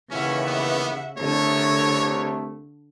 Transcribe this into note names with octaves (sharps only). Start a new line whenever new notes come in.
D#2 C#3 E3 C#4 E5 F#5
B3
C2 D3 A3 C#5